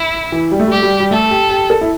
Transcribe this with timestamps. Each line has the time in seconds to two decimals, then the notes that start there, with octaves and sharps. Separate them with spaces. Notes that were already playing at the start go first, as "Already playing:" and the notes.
Already playing: E4
0.32 E3
0.51 G3
0.60 A3
0.67 G3
0.71 A3 G4
0.82 G3
1.00 G3
1.11 A3 A4
1.30 G4
1.50 G4
1.70 A4
1.81 E4